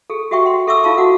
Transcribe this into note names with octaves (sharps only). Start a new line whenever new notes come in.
G#4 A4
F#4 G4 E5 G5 C#6
F#5 C6
A4 E5 C#6 D6 E6
E4 F4 A4 F5 A5 C#6
F#4 F#5